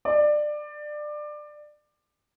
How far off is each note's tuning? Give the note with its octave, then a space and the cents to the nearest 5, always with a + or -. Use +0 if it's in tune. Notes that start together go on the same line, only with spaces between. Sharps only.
D5 +20